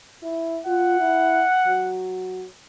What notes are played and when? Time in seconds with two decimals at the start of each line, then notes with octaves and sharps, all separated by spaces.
0.23 E4
0.66 F4 F#5
0.99 E4
1.67 F#3